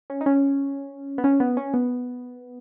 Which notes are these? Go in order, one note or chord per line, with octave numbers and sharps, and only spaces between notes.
C#4
D#4
C#4
B3
C#4
B3
C#4
B3